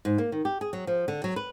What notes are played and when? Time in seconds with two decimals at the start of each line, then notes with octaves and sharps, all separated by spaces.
0.05 G#2
0.18 A#3
0.32 D#3
0.45 G4
0.61 G#4
0.73 F#3
0.87 F3
1.08 D3
1.24 F#3
1.36 B4